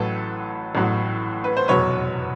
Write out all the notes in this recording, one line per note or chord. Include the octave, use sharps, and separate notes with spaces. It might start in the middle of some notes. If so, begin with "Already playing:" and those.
Already playing: A1 A2 F#3 A4 B4
A1 A2 F#3
B4
C5
F1 E2 B2 F#3 B4 C#5